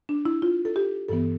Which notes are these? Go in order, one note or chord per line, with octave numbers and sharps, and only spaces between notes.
D4
E4
F4
A4
G4
G2 E3 B3 A4